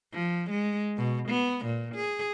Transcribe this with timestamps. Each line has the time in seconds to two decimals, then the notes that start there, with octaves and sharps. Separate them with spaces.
0.13 F3
0.50 G#3
0.97 B2
1.29 B3
1.65 A#2
1.95 G#4